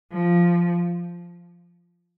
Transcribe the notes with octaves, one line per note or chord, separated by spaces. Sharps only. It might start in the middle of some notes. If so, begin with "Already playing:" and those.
F3